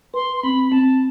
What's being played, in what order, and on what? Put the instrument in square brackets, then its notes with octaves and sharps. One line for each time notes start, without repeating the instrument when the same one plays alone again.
[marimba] B4 [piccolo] C6
[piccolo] C6
[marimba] C4 [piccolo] B5
[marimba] C4 [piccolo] A5